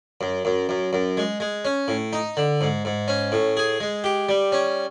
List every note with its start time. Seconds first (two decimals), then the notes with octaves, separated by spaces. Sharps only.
0.21 F#2
0.45 F#2
0.69 F#2
0.93 F#2
1.17 G#3
1.40 G#3
1.65 C#4
1.88 A2
2.13 D#4
2.37 D3
2.61 G#2
2.85 G#2
3.08 C#4
3.32 A2
3.57 G#4
3.80 G#3
4.04 G4
4.29 G3
4.52 C#4